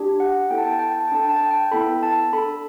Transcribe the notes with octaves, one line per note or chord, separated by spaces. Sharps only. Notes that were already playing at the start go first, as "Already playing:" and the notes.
Already playing: D4 G4
F#5
B3 E4 A4 G5
A5
G5
A5
G5
A5
G5
A5
G5
D4 A4 A5
G5
A5
G5
A5
G5
B3 E4 A4 B5
A5
D4 A4 B5